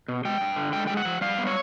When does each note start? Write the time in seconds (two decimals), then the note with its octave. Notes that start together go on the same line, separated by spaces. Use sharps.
0.08 B2
0.25 G#3 G5
0.41 G2
0.57 D3
0.73 G#3 G5
0.87 G#3 G5
0.97 F#5
1.05 F3
1.21 G3 F5
1.38 B3
1.47 C#5